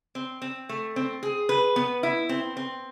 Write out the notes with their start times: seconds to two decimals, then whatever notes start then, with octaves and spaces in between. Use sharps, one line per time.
0.15 C4
0.42 C4
0.69 A3
0.96 C4
1.23 G#4
1.49 B4
1.76 B3
2.03 E4
2.29 C4
2.57 C4